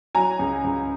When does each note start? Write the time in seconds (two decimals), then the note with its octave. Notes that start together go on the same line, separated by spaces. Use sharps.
0.15 F#3 G#5 A#5
0.39 C#2
0.64 C#2